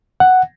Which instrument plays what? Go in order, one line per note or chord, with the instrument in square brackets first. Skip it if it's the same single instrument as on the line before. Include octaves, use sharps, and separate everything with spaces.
[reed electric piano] F#5